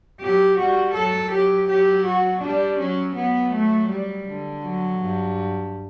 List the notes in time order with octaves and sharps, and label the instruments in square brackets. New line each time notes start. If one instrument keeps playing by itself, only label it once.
[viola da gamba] F#3 [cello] G4
[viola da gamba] G3 [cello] F#4
[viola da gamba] F#3 [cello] A4
[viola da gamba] F#3 [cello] G4
[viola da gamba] F#3 [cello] G4
[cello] F#4
[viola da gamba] G3 [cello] D4
[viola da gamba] F#3 [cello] C#4
[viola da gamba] F#3 [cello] B3
[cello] A3
G3
[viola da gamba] D3
[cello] F#3
[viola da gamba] G2